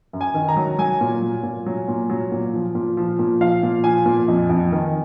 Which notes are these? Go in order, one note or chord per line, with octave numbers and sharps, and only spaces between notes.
F#2
G#5
D#3
A#5
F#3
F#3 G#5
A#2
F#3
A#2
F#3
A#2
F#3
A#2
F3
A#2
F3
A#2
F3 F5
A#2
F3 G#5
A#2
F2
F2
D#3